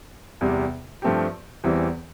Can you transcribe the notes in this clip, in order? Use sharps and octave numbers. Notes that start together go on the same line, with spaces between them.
E2 C3 G3
G2 F3 A3 C4 G4
E2 E3 G3 C4